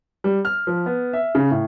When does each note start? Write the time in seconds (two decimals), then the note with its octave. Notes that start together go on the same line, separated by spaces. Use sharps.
0.24 G3
0.45 F6
0.67 F3
0.86 B3
1.13 E5
1.35 C#3
1.51 A2